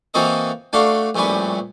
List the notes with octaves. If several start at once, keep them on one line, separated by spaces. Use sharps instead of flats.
E3 A#3 C4 F#4 A4 D#5
A3 D4 F#4 F5
A#1 A2 G3 C#4 B4